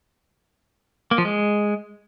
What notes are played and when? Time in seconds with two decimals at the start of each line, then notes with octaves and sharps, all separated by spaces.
1.11 A#3
1.18 F3
1.25 G#3